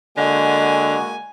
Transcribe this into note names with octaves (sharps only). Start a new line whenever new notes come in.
D3 G#3 A#3 F#4 D#5 G#5